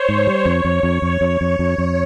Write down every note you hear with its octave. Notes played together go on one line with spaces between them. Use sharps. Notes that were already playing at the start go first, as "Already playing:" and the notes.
Already playing: C5 C#5
G#2
G3
F2
F2
F2
F2
F2 C#5
F2
F2
F2